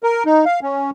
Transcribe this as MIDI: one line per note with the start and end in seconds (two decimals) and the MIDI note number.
0.03 0.23 70
0.26 0.45 63
0.45 0.60 77
0.62 0.90 61